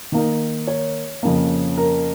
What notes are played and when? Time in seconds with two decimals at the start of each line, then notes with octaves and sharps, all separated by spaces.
0.12 D#3 A#3 D#4
0.67 C#5
1.23 F2 C#3 A#3
1.77 A#4